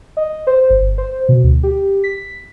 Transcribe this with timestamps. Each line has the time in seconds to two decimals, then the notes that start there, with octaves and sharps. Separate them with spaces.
0.17 D#5
0.47 C5
0.70 G1
0.98 C5
1.29 B2
1.44 D2
1.63 G4
2.04 B6